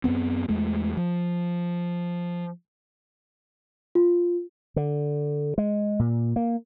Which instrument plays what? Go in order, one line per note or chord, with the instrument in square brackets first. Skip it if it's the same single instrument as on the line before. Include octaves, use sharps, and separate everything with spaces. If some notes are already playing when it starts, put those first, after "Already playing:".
[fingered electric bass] F#2 A2 B3 C4
E2 G#3 A3
F3
[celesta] F4
[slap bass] D3
G#3
A#2
A#3